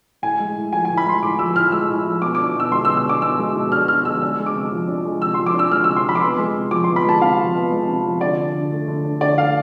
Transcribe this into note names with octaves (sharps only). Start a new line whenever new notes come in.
A2 G#5
G#3
A2
F3 G#5
G#5
A2
B5
G#3 C6
A2 D6
F3 E6
A2 F6
G#3 E6
A2
F3
B2 D6
D6
D4
B2 E6
G#3 C6
E6
B2
E6
D4 D6
B2 E6
G#3
B2
D4 F6
B2 F6
G#3 E6
D4 E6
G#3
D6
C3
F3
D4
G#3
C3 E6
C6
F3
D6
D4 E6
G#3 F6
E6
C3
C6
F3 B5
D6
B3 C6
G#3
C3
F3 D6
C6
B3
B5
G#3 A5
C3 F5
F3
B3
G#3
C3
F3
D3 D5
D4
D3
A3
D3
D4
D3 D5
A3 F5